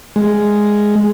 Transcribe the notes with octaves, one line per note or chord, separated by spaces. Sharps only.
G#3